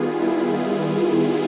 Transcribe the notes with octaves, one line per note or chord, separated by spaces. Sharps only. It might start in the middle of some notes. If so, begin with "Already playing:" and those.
Already playing: D#3 G3 B3 F4 G#4
E4
F4